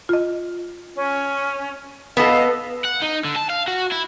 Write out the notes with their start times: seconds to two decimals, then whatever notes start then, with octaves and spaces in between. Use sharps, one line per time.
0.09 F4 D#5
0.96 C#4
2.17 B3 A4 D#5 F5
2.85 F#5
3.02 D#4
3.25 D3
3.36 A5
3.50 F5
3.68 F#4
3.92 E4